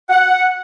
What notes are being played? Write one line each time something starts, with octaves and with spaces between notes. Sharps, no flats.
F#5